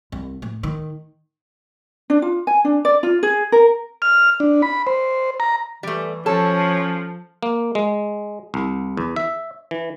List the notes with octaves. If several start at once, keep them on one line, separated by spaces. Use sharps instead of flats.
C2
A2
D#3
D4
F4
G#5
D4
D5
F4
G#4
A#4
F6
D4
B5
C5
A#5
E3 G3 A3
F3 C#4 A4 C#5 A5
A#3
G#3
C2
E2
E5
E3